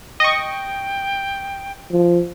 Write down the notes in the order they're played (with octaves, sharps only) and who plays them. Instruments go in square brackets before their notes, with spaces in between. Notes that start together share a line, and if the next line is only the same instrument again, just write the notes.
[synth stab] D#5 C#6 [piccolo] G5
[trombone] F3